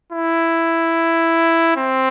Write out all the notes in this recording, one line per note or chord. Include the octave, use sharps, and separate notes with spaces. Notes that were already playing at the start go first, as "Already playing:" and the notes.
E4
C4